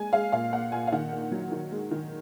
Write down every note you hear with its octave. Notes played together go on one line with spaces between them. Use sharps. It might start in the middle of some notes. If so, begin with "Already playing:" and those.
Already playing: G#3 G#5
G#3 F5
A#2 F5
A#3 F#5
A#2 G#5
F5
D#3 F#5
A#3
F#3
D#3
G#3
D#3